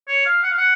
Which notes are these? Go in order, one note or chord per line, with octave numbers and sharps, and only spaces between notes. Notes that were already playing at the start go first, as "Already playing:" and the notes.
C#5
F5
F#5
F5
F#5